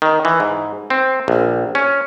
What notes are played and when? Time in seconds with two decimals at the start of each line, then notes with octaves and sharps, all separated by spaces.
0.02 D#3
0.25 E3
0.40 G#2
0.90 C4
1.28 A#1
1.75 C#4